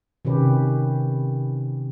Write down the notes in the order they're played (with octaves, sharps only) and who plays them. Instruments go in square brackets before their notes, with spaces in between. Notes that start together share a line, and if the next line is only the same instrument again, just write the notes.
[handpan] C3 D#3 C#4 G4 B4